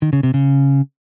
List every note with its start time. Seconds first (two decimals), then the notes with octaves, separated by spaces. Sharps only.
0.02 D#3
0.13 C#3
0.23 C3
0.34 C#3